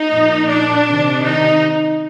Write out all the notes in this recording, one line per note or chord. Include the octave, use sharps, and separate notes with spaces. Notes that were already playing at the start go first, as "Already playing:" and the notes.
Already playing: D#4
A#2 F3
D4
C3 D#3
D#4